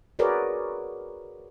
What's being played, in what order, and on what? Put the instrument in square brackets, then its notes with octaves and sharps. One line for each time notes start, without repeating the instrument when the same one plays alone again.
[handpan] F#4 G#4 A#4 B4 C#5 D5